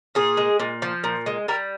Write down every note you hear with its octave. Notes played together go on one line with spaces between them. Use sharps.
A#2 G#4
G#3
A#2
F3
A#2
G#3
G3 A#4